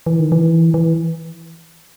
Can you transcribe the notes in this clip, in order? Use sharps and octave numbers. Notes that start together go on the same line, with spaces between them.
E3
D#3
E3
E3